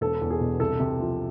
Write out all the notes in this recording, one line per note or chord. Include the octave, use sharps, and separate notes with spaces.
E1 A4
E2
G#4
B2
C2 A4
C3
F3